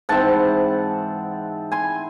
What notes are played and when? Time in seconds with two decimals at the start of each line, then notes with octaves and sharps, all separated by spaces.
0.09 G#2 E3 C4 F#5 A5
1.72 G#5 C6